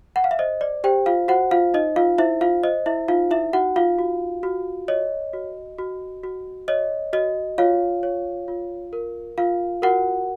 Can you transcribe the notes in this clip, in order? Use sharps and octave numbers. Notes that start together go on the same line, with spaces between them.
F#5
F5
E5
C5 D#5
D5
G4 C5 G5
F4 F5
F#4 C5 F#5
F4 F5
D#4 D#5
F4 F5
E4 C5 E5
F4 F5
C5 D#5
E4 E5
D#4 F4 F5
E4 E5
D#4 F#4 F#5
F4 F5
F#4
F#4
C#5 D#5
F#4
F#4
F#4
C#5 D#5
F#4 D#5
F4 C#5 F5
C#5
F4
A#4
F4 F5
F#4 A#4 F#5